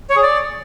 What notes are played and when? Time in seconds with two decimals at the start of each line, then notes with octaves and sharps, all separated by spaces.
0.10 C#5
0.16 G#4
0.23 D5